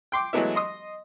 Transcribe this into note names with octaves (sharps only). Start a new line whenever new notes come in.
G5 C6 D6
E3 F#3 G#3 A3 B3 E4
D#5 C6 D#6